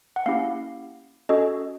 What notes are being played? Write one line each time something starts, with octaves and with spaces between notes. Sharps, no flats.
F#5
A#3 C#4 E4 G4 F5
C#4 F#4 A4 D#5